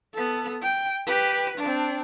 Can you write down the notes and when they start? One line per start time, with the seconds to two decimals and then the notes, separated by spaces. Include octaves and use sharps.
0.14 B3 A4
0.62 G5
1.06 G4 B4
1.58 C4 D4